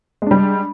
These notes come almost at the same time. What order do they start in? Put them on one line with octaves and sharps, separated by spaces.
G#3 D4 G3